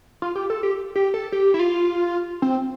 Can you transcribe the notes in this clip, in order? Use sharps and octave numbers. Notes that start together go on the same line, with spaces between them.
F4
G4
A4
G4
G4
A4
G4
E4
F4
C4